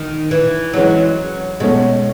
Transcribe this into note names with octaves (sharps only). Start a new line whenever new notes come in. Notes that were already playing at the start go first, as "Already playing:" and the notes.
Already playing: D#3
E3
E3 F#3 G#3 C#4
B2 G#3 A3 C#4